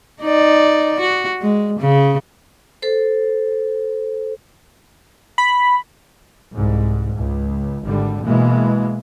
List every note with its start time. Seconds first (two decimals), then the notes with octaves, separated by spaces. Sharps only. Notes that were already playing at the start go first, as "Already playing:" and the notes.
0.21 D#4 D5
1.00 F#4
1.41 G#3
1.80 C#3
2.82 A4 C5
5.38 B5
6.52 C2 G#2
7.16 C#2
7.85 G#1 D3 G3
8.24 B2 E3 G#3 A#3